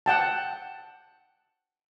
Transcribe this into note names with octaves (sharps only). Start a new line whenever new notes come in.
F#5 G5 A5